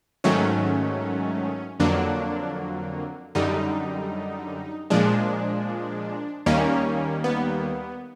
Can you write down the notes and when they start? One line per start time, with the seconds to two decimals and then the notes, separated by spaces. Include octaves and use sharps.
0.24 G#2 D#3 F#3 A3 C#4
1.80 F2 D3 F#3 A#3 D4
3.35 F#2 D3 G3 D#4
4.90 A#2 F3 G#3 D4
6.46 D#2 D#3 G3 A#3 C#4
7.24 B3